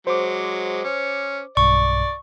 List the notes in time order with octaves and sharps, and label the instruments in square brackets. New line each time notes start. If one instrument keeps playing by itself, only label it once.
[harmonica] F#3 G#3 [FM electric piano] C5 D6
[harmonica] C#4
[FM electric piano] B1 G2 [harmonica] D5 [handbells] C#6